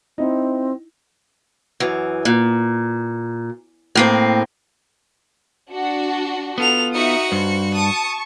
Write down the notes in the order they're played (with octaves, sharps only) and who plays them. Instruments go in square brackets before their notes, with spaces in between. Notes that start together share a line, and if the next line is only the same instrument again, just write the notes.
[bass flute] C4 [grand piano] D#4 E4
[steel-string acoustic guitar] F#2 E3
A#2
A2 A#3 C4
[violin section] D4 F#4
[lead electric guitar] B3 F4 [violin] A4 F7
[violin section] D#4 E5 D#6 [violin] F#4 C#7
[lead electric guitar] G2 [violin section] C5
[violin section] A5 C#6 [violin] D#6